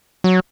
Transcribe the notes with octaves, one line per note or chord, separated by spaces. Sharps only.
F#3